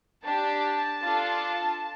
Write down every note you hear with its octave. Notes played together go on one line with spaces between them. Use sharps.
D4 G4 A5
D4 F4 A4